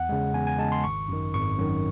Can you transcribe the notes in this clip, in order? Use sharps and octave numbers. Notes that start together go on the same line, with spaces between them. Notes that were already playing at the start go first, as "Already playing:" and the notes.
Already playing: E2 F#5
C#3 G#3
E2 G#5
G#5
C#3 G#3 A5
C6
G#1 C#6
F#2 D#3
G#1 C#6
F#2 D#3